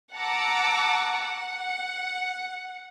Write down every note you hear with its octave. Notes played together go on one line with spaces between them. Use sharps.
F#5 A5 A#5 D6 E6
F#5